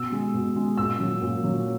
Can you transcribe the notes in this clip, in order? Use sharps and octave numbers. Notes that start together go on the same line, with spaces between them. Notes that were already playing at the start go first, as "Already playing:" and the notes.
Already playing: B2 E6
G#3
B2
G#3
A#2 E6
F#3
A#2
F#3